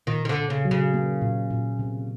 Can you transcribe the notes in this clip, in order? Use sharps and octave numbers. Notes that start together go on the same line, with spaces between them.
A#2 D#3
D#3
D3
A#2
C#3
F#3
C#3
A#3
A#2
A#2
C3